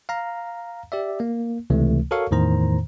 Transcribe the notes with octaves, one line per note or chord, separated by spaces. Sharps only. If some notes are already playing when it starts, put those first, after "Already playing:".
F5 A#5
G4 D5 E5
A#3
C#2 C3 E3 A3
F#4 A4 A#4 C#5 F5 C#6
E2 A2 D#3 C5 A#5